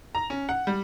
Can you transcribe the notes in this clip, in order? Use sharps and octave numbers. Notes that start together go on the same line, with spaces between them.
A#5
C#4
F#5
G3